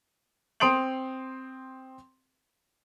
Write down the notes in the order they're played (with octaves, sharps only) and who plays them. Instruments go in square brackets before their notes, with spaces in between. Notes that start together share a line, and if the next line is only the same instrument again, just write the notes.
[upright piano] C4 C6 D#6 D7 F7 F#7